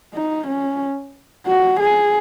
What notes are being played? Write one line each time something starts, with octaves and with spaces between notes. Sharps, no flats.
D#4
C#4
F#4
G#4